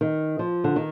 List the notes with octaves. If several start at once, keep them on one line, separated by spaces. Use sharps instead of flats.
D#3
F3
D3
D#3